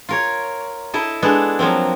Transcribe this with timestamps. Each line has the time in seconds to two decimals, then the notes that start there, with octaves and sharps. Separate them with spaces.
0.09 F4 A#4 C#5
0.94 E4 A4 D#5
1.22 G#3 B3 D4 A4
1.59 F3 F#3 A#3 C4